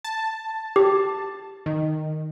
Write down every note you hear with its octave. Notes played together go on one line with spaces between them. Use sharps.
A5
G4
D#3